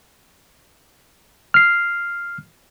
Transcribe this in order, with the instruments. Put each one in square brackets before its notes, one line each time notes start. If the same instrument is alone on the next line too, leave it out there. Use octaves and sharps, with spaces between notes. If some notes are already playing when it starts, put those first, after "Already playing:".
[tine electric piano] F6 C7